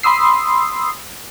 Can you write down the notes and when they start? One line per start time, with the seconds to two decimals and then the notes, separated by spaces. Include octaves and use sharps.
0.03 B5 C6 D#6 E6 C7